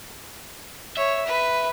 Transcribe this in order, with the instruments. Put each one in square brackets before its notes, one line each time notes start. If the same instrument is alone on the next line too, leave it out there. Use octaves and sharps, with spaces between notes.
[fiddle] C#5 [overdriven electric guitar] E5
[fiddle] B4